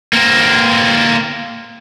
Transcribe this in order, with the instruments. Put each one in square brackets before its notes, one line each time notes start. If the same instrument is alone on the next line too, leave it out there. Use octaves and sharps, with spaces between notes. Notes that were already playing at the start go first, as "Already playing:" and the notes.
[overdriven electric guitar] A#3 C4